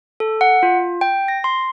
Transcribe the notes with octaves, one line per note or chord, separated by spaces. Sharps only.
A4
F#5
F4
G5
A#6
C6